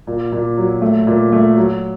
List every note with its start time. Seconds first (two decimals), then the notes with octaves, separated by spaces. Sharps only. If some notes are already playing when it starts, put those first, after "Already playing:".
0.07 A#2
0.32 A#2
0.57 F#3
0.82 A3
1.07 A#2
1.32 A3
1.56 F#3